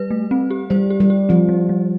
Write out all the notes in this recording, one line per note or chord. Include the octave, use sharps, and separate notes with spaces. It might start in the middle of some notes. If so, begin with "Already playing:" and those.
Already playing: G3 B4
A3
C4
G4
G3 C5
G4
G3
G4
F3 C4
G3
G3